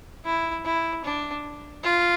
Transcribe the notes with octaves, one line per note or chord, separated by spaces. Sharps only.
E4
E4
D4
F4